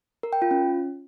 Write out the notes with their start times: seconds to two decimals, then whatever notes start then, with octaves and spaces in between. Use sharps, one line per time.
0.23 A#4
0.33 G5
0.42 F4
0.51 C#4